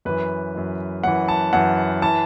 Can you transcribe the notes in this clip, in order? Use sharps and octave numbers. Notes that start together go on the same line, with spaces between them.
F#2 E3 B4
F#2 E3
F#2 E3 F#5
A5
F#2 E3 F#5
E3 A5